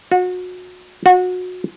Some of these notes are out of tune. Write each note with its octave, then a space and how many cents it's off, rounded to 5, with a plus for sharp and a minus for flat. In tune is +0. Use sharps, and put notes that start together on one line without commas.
F#4 -30
F#4 -25